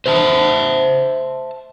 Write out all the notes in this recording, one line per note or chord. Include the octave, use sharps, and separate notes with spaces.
C5 E5 G#5 A5